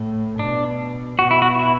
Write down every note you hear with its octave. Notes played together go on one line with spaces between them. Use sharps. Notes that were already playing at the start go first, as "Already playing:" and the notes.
Already playing: A2
B2 D4
B2 F#4
E4
F#4
E4